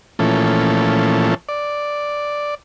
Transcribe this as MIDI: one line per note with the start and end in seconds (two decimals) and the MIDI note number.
0.19 1.34 46
0.19 1.34 52
0.19 1.34 53
0.19 1.34 57
0.19 1.34 61
0.19 1.34 69
1.49 2.55 74